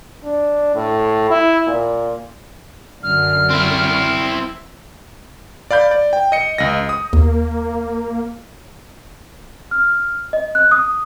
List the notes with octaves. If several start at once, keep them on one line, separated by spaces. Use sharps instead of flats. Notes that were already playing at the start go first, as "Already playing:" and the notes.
D4
A2
E4
A#2
F#2 D3 F6
C4 E4
D5 F5 B5 G6
D5
G5
D#5 C#7
C#2 D#5 A#6
D#6
D#2 A#3
F6
D#5
F#6
D#6